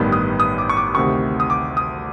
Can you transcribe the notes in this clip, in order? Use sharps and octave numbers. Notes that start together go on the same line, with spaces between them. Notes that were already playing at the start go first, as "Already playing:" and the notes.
Already playing: A1 G2 D#3 G3 B3
D#6
D#6
D6
C#6
D6
D2 C3 D#3 C#6
D#6
D6
D#6